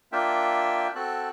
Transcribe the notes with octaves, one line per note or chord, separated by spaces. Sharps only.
A#3 D4 F4 E5 G5
C4 F#4 A4 A5 F#6